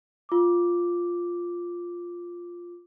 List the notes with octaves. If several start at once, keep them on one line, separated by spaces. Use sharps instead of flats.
F4 D6